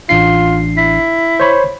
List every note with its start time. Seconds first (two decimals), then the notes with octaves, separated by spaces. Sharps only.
0.09 A1 D4 F4 C7
0.77 E4
1.40 C5 C#5 B5